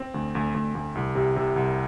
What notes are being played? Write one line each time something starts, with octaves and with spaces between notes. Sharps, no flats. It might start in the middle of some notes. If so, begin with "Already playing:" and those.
Already playing: C4
D2
D2
D2
D2
C2
C3
C3
C2